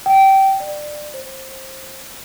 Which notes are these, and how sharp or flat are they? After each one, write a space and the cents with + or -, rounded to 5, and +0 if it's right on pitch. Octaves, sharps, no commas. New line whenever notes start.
G5 -20
D5 +20
C5 +20